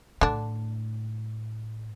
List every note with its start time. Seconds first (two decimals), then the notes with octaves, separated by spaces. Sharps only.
0.21 A2 D3 D4